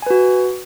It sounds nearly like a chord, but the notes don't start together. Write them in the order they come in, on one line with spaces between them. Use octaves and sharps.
G#5 B4 F#4